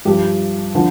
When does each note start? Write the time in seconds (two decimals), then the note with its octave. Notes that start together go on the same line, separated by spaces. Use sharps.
0.05 G2 F3 G4
0.75 D3 F3